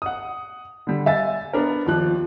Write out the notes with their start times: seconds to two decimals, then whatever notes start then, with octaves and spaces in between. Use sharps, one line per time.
0.02 F#5 D#6
0.87 D3 G3
1.06 E5 G#5 A6
1.53 B3 D4 A#4
1.86 D#2 F3 F#6